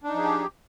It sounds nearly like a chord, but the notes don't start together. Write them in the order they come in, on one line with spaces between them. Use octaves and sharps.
D4 D#4 F3 G#4 G4